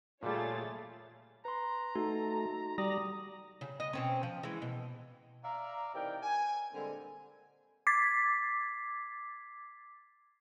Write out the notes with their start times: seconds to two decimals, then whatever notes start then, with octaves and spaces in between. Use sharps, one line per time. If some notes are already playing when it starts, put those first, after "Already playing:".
0.23 A#2 G3 A3 F4 G#4 C#5 A6
1.45 B4 A#5 C6
1.95 A3 D#4 F#4
2.78 G3 D5 A#5 D#6
3.61 C#3
3.80 D#5
3.93 B2 C4 C#4
4.23 F3
4.43 E3 G#3
4.62 B2
5.44 D5 E5 F5 A#5
5.94 C3 E3 D#4 A#4 D5 G5
6.23 G#5
6.73 A#2 D3 G3 G#3 C4 G#5
7.87 D6 G#6 A6 B6 C7